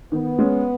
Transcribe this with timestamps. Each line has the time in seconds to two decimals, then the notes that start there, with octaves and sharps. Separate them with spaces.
0.12 D#3 B3
0.38 G#3 C#4